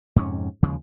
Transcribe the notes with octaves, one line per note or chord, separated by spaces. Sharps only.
F2 G#2 C3 C#4
D#2 C#3 F3 G#3